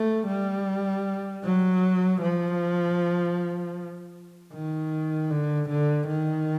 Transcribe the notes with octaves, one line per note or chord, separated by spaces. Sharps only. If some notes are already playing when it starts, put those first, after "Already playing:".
Already playing: A3
G3
F#3
F3
D#3
D3
D3
D#3